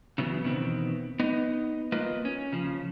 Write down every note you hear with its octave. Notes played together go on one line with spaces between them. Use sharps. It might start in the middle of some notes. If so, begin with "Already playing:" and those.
C#3 E3 F#3 B3
E2 B2 D#3 B3 C4
B3 D#4 D#5
A#3 F4 B4 D#5
C#4
C#3 F3